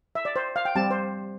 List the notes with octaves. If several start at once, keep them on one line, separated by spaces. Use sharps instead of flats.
E5
D5
C5
F5
G5
G3 C4 G4 A5
C5